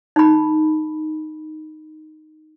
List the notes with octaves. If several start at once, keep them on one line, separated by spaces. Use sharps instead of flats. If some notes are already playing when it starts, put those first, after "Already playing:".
D#4 B5